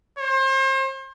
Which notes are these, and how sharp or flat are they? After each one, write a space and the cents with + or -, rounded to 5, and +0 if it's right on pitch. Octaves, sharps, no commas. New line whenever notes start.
C5 +35